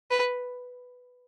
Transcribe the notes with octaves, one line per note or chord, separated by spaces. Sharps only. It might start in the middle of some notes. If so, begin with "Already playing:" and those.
B4